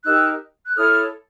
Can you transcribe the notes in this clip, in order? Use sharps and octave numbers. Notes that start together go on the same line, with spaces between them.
D#4 G4 A#4 E6 F#6
F#6
E4 A4 C#5 D#6 F6